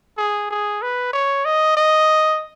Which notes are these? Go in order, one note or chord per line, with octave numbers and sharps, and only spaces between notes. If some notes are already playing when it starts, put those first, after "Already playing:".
G#4
G#4
B4
C#5
D#5
D#5